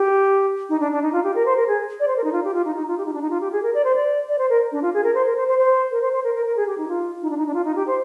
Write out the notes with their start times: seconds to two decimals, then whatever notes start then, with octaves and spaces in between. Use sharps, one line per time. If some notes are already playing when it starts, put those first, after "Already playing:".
Already playing: G4
0.69 D#4
0.80 D4
0.92 D4
1.02 D#4
1.13 F4
1.24 G4
1.35 A#4
1.46 C5
1.56 A#4
1.68 G#4
2.00 D5
2.08 C5
2.17 A#4
2.24 D#4
2.33 F4
2.44 G4
2.54 F4
2.65 D#4
2.76 D#4
2.87 F4
2.98 G4
3.06 D#4
3.14 D4
3.22 D#4
3.31 F4
3.41 G4
3.52 G#4
3.63 A#4
3.74 D5
3.84 C5
3.95 D5
4.29 D5
4.38 C5
4.50 A#4
4.72 D4
4.82 F4
4.94 G#4
5.04 A#4
5.15 C5
5.26 A#4
5.36 C5
5.48 C5
5.58 C5
5.91 A#4
6.02 C5
6.13 C5
6.24 A#4
6.34 A#4
6.46 A#4
6.57 G#4
6.67 G4
6.78 D#4
6.88 F4
7.22 D#4
7.30 D4
7.38 D#4
7.46 D4
7.54 F4
7.64 D#4
7.76 G4
7.87 C5